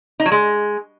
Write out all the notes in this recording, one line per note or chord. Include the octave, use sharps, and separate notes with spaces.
D#4
F#3
G#3